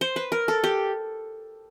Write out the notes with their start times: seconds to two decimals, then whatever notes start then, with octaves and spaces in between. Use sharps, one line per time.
0.01 C5
0.16 B4
0.32 A#4
0.48 A4
0.64 G4